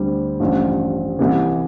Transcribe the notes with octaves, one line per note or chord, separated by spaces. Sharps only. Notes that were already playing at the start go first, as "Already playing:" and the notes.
Already playing: D2 D3 G3 C4 G4
A1 G2 F3
C2 C3 E3